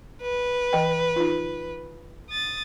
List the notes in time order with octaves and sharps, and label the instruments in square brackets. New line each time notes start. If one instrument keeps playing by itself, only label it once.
[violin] B4
[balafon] E3 D#5 G5
D#4 F4
[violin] D#6 A6